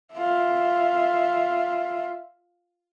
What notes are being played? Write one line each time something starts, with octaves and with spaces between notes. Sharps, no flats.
F4 E5